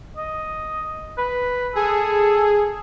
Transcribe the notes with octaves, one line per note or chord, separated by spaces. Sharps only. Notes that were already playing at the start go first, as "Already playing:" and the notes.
D#5
B4
G#4 A4